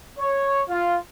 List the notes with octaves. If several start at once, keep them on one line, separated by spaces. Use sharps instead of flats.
C#5
F4